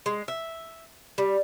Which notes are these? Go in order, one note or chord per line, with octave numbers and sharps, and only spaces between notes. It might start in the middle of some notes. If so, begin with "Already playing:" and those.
G#3
E5
G3